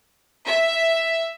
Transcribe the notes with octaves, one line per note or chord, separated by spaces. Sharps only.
E5